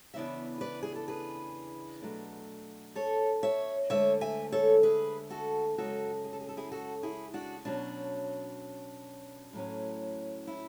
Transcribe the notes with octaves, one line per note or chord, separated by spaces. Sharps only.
E2 C#3 E3 B3 D4 E5
B4 D5
G#4
A4
G#4 B4
B2 F#3 A3 D4
A4 C#5
C#5 E5
D2 D3 G#3 C#5 E5
E5 G#5
A4 C#5
G#4 B4
F#4 A4
F#2 C#3 G#3 C#4 F#4 A4
G#4
A4
G#4
A4
E4 G#4
F#4 A4
E4 G#4
D4 F#4
B2 F#3 C#4 D4
A2 F#3 C#4
E4